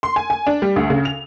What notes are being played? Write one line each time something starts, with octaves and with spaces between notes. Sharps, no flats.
C6
G#5
G#5
D4
G3
D2
C#3
F7